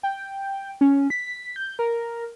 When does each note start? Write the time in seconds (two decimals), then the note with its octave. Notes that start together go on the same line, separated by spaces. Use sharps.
0.03 G5
0.81 C#4
1.10 B6
1.56 G6
1.79 A#4